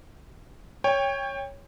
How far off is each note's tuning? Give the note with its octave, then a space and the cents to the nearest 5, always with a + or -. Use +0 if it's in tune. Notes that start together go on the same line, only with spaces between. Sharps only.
C#5 +0 G5 +25